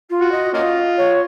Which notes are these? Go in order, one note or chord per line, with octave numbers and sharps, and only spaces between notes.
F4
F#4
D#5
A#3 C#4 F4 D#5
C#5